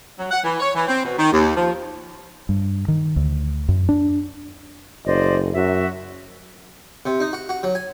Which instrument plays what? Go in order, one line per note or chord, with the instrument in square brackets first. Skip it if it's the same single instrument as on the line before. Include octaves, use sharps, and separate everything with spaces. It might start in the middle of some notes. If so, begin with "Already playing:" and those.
[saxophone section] F#3
F#5
E3
C#5
E3
C4
B2
D#3
D#2
F3
[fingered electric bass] G2
D#3
D2
F#2
D4
[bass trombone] F#1 [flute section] C5 D5 D#5
[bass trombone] F#2 [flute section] F#4 E5
[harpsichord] C3
D#4
F#4
F#4
F#3
G#5